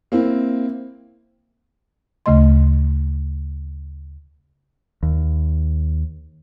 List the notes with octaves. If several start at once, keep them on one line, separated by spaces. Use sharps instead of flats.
A#3 C4 E4
D2 C#3 A3 D#5 C6
D#2